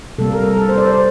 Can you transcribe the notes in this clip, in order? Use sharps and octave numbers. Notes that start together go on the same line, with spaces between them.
C3 G3 A#3 A4
A#4
A#4
A4
C5
D5
C5